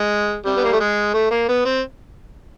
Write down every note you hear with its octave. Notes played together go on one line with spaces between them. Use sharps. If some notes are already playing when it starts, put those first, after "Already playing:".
Already playing: G#3
C3 G3
B3
A#3
A3
G#3
A3
A#3
B3
C4